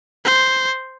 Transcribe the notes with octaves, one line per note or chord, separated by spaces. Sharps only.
C5